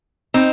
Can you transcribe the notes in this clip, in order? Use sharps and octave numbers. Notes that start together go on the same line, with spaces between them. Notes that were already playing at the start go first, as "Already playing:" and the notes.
C4 D#4